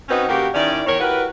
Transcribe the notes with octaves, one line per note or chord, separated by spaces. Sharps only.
C4 C#4 D#4 F#4 B4 C5
C#3 A#3 F#4 G4
D#3 C#4 E4 D5
E2 D#3 A#4 C#5
E4 F#4 G4 A#4 B4